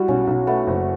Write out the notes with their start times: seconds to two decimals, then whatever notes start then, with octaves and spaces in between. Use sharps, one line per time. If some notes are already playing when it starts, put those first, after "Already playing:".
Already playing: G3 E4 F#4
0.08 B1 C#4
0.27 B1
0.47 A3 B3
0.67 F#1